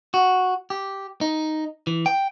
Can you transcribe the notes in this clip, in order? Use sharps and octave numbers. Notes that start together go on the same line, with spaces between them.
F#4
G4
D#4
E3
G5